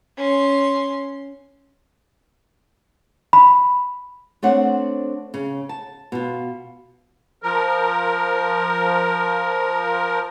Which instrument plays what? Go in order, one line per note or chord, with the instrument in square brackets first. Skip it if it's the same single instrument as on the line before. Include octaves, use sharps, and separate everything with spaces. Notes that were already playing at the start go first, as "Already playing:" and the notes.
[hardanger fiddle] C#4 C6
[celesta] B5
[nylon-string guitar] A3 C4 D4 C5 C#5 F#5
C#3
A5
B2 F4
[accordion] F3 A#4